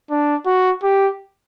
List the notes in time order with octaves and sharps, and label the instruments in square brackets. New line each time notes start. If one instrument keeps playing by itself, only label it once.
[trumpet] D4
F#4
G4